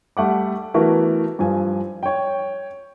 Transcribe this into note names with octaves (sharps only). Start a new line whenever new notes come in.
G3 A3 F#5 D6
E3 A3 B3 F#4 A#4
G2 F3 G#5
C#5 G5